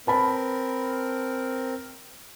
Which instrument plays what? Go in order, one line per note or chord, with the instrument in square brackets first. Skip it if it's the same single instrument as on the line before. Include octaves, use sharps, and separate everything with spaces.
[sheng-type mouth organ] C4 A#4 [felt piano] B4 A5 B5